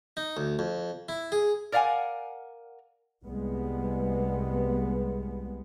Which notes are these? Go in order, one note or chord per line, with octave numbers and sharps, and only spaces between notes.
D#4
D2
F2
E4
G#4
A#4 D5 F5 F#5 G#5
C2 G3 G#3 B3